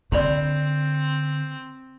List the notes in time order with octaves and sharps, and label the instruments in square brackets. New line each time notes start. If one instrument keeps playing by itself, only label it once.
[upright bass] D3 [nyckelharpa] C4 [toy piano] D5 B5 C6